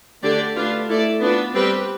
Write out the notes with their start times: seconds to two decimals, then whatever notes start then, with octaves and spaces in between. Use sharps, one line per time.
0.23 D3 A3 D4 G4 D5
0.56 A3 D4 F4 B4
0.88 A3 E4 A4 D5
1.21 B3 D4 F4 B4
1.53 G3 C4 G4 B4